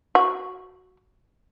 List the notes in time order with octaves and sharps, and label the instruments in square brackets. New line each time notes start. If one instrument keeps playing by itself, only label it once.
[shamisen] F#4